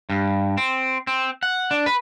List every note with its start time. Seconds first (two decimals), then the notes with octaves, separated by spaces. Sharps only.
0.10 G2
0.57 C4
1.07 C4
1.43 F#5
1.71 D4
1.86 B4